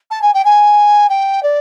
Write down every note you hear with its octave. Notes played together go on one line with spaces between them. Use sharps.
A5
G#5
G5
G#5
G5
D5